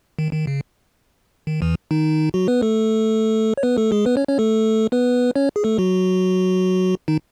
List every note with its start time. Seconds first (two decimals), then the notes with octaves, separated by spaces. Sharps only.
0.19 D#3
0.33 D#3
0.47 C#3
1.47 D#3
1.62 E2 E3
1.91 D#3 D#4
2.34 F#3 F#4
2.48 B3 B4
2.62 A3 A4
3.57 C#5
3.63 B3 B4
3.78 A3 A4
3.92 G#3 G#4
4.06 B3 B4
4.17 C#4 C#5
4.27 C#4 C#5
4.39 A3 A4
4.92 B3 B4
5.36 C#4 C#5
5.56 G#4
5.64 A3 A4
5.78 F#3 F#4
7.08 D#3 D#4